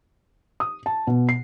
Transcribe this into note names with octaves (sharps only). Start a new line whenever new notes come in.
D#6
A5
B2
C7